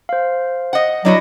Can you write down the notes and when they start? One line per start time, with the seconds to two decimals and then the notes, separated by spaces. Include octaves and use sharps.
0.09 C5 F5
0.73 D#5 F#5
1.05 F#3 D4 E4 F#4 D#5